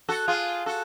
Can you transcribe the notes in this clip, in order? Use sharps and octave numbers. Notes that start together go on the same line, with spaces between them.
F#4 A4
F4 G#4
F#4 A4